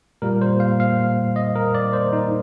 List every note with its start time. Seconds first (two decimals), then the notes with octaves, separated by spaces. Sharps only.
0.22 A#2 G3 A#3 A#4
0.42 C5
0.60 F5
0.80 F5
1.36 D#5
1.56 A#4
1.74 D5
1.93 C5
2.13 D#4